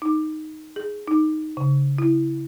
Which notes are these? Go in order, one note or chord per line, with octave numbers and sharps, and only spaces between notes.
D#4
G#4
D#4
C#3
E4